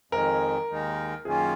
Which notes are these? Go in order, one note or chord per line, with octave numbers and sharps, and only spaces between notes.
F2 D#3 G#3 A#4
D#2 D#3 G#3 D#4
F#2 D#3 A#3 C#4 F4 G#4